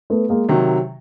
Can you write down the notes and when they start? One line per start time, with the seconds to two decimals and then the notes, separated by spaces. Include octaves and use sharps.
0.10 A3 B3
0.29 G#3 A#3
0.49 C3 D#3 F#3